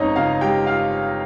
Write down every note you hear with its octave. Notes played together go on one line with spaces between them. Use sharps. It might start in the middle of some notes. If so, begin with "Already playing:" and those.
Already playing: G1 F2 G#3 C#4 D#4 C#5 D#5
C#3 F4 F5
G#3 G4 G5
F4 F5